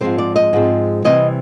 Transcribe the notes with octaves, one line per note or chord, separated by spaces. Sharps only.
G#2 F3 G#3 C4 C5
D5
D#5
G#2 F3 G#3 C4
C3 E3 G3 C4 E4 D#5